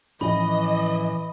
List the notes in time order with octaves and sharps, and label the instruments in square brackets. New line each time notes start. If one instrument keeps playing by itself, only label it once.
[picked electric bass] A2 F3 C#4 [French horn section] E3 [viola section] D#5 [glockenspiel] B5